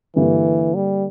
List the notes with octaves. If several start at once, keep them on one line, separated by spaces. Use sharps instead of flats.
G2 D3 E3 A#3
G3